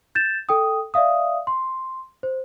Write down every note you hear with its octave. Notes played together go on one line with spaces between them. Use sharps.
G6 A6 E7
A4 G5 D#6
D5 E5 F5 D#6
C6
C5